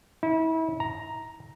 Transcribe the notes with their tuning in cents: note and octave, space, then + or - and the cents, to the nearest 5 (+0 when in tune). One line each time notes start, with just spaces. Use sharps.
E4 -35
A#5 +5